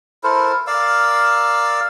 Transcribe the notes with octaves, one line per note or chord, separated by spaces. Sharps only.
E4 A4 A#4 C5
A#4 D5 F5 E6